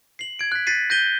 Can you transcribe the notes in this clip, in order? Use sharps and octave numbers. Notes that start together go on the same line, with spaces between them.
C7 F#7
G#6 D7
F#6 B6
A6 B6 C7 D#7
G6 A#6 D#7 G7